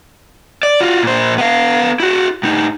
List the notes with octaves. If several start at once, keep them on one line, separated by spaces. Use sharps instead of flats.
D5
F4 F#4
A#2 C5
B3 F5
E4 F#4
A2 D#4